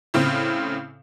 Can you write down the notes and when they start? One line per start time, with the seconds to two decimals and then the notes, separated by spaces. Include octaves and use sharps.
0.14 A2 C#3 C4